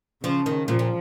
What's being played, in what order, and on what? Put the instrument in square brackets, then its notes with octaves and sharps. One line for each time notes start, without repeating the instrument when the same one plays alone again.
[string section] C#3 [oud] F3
[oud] D#3
[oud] A#2 [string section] F3
[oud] A#2